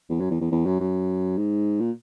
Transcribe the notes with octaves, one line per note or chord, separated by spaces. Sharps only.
E2
F#2
E2
E2
E2
F#2
F#2
G#2
A#2